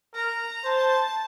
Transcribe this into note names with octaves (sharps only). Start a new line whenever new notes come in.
A#4 A#5
C5 A5